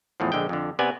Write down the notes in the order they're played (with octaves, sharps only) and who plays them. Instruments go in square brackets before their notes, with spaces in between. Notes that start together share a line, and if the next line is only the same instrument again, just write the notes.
[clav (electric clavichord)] E2 A2 F3
A#1 D3 G#3 G5
F2 D3
C3 B3 D5 G#5